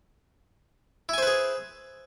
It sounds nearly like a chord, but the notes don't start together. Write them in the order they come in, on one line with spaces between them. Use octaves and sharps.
E4 G#5 C5 B4 G#4